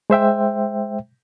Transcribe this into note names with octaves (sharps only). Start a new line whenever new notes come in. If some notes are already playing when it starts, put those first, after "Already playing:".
G#3 C5 E5 G5